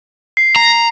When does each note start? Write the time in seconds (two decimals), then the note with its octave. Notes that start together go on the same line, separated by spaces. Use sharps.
0.37 C7
0.56 A#5